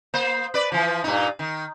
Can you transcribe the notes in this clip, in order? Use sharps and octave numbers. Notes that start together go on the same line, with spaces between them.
A#3 C5
B4 D5
E3 F3
G2 A#2 D#4
D#3